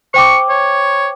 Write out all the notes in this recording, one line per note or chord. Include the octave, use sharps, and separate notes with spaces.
C5 G5 C#6 D6
C#5